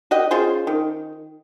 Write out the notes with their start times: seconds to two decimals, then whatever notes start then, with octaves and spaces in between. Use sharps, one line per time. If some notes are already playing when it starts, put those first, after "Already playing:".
0.11 F#4 G4 D#5
0.31 C#4 F4 G#4 C5
0.67 D#3